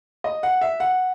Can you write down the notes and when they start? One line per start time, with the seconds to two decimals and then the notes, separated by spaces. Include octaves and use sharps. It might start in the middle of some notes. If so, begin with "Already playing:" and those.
0.24 D#5
0.43 F#5
0.61 E5
0.80 F#5